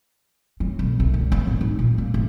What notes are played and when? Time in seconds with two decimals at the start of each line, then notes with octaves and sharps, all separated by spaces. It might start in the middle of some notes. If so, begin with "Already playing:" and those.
0.60 F#3
0.79 B1
1.00 C2
1.14 D3
1.32 B3
1.47 A2
1.61 D#4
1.79 A#2
1.98 A#3
2.14 A2